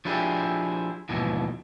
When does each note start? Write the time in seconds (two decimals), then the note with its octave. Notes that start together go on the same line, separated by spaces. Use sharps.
0.05 F3 D4 E4 G4 G#4
1.09 D#2 G#2 B2 E3 F3